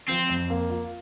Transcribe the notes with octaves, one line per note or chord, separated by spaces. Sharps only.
F3 C4
F2
A#3
F4